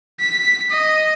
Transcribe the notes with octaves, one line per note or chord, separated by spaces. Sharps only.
B6
D#5